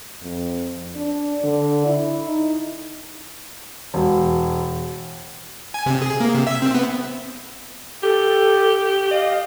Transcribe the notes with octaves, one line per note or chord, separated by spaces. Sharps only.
F2
D4
D3
E4
D#4
E1
G#5
C3
G#4
A#3
C3
E5
C4
B3
G4 A4
D#5 F5